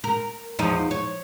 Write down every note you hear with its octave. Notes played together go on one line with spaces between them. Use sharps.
A#4
E2 F3 D#4
C#5